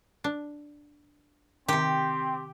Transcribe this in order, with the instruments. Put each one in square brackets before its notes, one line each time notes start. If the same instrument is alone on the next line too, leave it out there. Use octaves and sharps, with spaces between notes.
[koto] D4
[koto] C3 D#3 [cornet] C4 [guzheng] G4